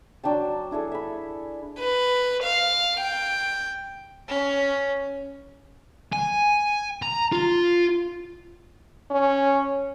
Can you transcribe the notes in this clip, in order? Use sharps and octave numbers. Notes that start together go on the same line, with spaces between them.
F#3 D4 G5 A5
D4 E4 G#4 A4
E5 B5
B4
F5
G5
C#4
G#5
A#5
F4
C#4